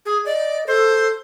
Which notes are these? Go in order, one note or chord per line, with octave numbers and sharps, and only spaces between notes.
G#4
D5 D#5
A4 C5